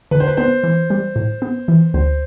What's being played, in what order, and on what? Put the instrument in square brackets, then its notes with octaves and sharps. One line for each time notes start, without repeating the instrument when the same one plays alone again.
[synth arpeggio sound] D3 [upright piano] B4
[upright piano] C5
B4
[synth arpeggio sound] B3 [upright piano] C5
[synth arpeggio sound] E3
G3
A2
B3
E3
[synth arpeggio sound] D2 [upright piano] C5